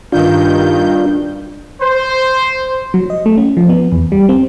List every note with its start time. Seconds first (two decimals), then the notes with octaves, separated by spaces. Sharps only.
0.12 G2 D#3 D4 F4 G6
1.81 C5
2.94 F#3
3.10 D#5
3.26 A3
3.38 C#4
3.57 F3
3.69 B3
3.92 E2
4.12 G3
4.29 C4